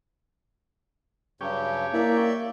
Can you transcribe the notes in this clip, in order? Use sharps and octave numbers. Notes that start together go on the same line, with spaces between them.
G2 C#3 F#3 C#4 G4
A#3 E4 A#4 D5 E5 D6